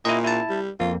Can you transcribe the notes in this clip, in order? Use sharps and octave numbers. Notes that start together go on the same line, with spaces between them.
A#2 E4 D#5
E4 A5
G3
F2 A#3 F4